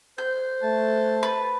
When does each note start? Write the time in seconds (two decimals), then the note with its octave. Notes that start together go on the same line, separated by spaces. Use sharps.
0.18 C5 G6
0.63 A3 A5
1.23 B4